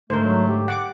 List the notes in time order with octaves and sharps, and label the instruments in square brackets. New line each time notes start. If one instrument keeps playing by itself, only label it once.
[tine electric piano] G#2 D3 [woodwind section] A3 [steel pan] A#4 C5
[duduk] F#3
G4
[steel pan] F#5 D6